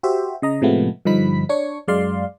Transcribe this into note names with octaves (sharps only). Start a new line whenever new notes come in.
F#4 G4 C5 E5
C#3 D#5 A#5
A2 C3 F3 G#3 A3 B3
G2 D3 F3 D#4 B5 B6
D4 C#5 C#6
F#2 G#3 D5 F5 C6